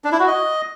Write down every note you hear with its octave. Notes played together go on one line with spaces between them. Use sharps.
D4
E4
F#4
D#5